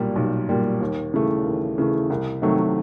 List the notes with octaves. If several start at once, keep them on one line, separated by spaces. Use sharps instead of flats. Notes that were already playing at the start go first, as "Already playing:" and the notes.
Already playing: B1 A#2 G3
B1
A#2 G3
D#2
C#3 E3 A3
D#2
C#3 E3 A3
C2
C3 D#3 F#3 A3